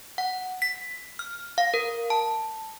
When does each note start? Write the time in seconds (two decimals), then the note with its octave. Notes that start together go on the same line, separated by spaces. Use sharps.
0.18 F#5
0.62 B6
1.19 F6
1.58 F5
1.74 A#4
2.10 A5